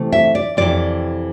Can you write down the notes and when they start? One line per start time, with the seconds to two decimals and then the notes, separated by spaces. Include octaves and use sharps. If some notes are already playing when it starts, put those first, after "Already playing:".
Already playing: C3 E3 A3 C4
0.12 E5
0.35 D5
0.57 F2 C3 E3 D5